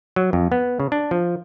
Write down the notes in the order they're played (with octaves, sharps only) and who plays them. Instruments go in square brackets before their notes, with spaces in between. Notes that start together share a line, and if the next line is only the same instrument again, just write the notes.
[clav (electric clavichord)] F#3
F2
B3
C#3
D4
F3